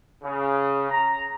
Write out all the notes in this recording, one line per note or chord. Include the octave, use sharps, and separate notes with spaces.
C#3
A#5